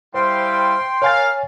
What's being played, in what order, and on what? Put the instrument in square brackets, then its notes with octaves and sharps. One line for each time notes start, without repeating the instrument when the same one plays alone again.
[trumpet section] G3 E4 F5 [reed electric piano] C5 [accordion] G5 C6
[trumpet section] A#4 F5 [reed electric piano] C#5 G#5 A6